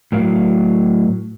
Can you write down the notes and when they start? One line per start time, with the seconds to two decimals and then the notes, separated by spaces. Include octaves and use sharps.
0.12 A2 F#3 A#4 F5